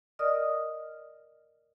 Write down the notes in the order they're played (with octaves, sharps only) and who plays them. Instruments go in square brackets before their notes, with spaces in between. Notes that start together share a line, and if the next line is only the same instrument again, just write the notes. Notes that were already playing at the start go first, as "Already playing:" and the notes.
[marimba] A#4 D5 D#5 D#6 F6